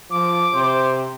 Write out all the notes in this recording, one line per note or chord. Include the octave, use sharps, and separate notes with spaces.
F3 D6
C3 C5